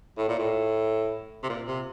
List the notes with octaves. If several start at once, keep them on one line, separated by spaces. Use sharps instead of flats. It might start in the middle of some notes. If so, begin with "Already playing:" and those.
A2
A#2
A2
C3
A#2
C3